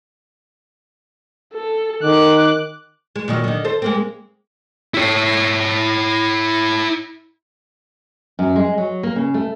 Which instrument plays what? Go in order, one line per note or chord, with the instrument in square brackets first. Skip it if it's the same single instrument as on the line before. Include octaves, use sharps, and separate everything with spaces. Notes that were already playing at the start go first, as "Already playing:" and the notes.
[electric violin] A4
[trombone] D#3 [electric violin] D6 F#6
[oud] G#3
A#2 D#3 F#3
D3 D#3
A4 C5
G#3 A#3 C4
[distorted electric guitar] E4 C#5
[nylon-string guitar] F#2
G#3
F#3
A#3
C#3
A3